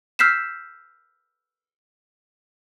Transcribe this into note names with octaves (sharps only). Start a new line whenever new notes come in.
E6 F6 G6 B6 C7 E7